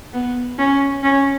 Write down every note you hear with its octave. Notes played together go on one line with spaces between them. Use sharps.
B3
C#4
C#4